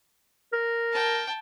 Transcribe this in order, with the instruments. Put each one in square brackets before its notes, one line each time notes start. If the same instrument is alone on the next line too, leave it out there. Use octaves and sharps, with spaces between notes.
[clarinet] A#4
[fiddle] G5 A5